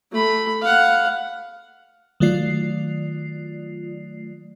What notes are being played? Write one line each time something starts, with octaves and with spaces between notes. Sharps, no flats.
A3 B5
F5 F#5
D#3 F#3 A3 F4 D5 C7